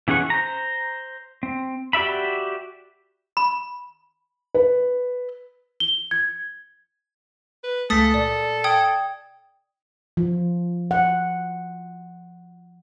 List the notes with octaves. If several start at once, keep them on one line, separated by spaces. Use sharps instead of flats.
E3 C#4 G#4 F#5 C#6
C5 A#5
C4
F#4 G4 D5 E5 B5
B5
B4
G7
G#6
B4
C#2 G#3 A3 A4 D#6 A6 B6
A#2 D5
G5 D#6 G#6
F3
F#5